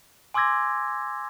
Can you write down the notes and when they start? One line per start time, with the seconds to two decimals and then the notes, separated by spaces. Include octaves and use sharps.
0.34 G#5 C6 D6 E6 G#6 A#6